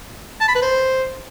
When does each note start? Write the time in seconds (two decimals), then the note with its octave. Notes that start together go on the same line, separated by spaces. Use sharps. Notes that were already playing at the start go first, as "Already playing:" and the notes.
0.41 A5
0.48 B5
0.55 B4
0.62 C5